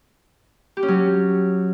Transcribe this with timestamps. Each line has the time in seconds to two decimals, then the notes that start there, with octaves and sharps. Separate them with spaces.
0.77 G4
0.83 C#4
0.88 F#3